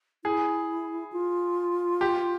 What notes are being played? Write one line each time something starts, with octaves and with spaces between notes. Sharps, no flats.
E4 G#4
F4
G4